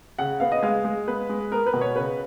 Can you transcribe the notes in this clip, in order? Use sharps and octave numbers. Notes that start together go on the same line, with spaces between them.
C#3 F#5
B3 F5
D#5
G#3 F5
G#3
B3 B4
G#3
B3 A#4
B4
B2
C#5
C#3 B4